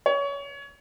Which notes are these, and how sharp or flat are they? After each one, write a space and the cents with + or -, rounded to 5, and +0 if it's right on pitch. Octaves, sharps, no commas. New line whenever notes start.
C#5 +25